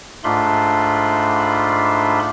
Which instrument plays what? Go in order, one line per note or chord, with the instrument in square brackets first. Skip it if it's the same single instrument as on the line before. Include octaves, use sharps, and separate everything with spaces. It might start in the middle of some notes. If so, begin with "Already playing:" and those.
[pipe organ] G#2 A3 D4 F4 B5 C6